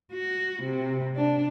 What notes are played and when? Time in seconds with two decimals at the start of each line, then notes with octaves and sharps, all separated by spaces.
0.12 F#4
0.64 C3
1.16 D4